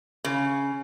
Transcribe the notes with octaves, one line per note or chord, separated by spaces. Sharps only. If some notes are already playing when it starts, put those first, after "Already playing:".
C#3